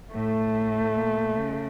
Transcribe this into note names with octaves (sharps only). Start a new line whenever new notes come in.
A2 A3
A#2
C#3